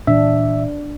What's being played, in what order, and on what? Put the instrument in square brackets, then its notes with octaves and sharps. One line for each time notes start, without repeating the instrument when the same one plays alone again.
[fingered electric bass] A#2 E3 [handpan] D4 [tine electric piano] E5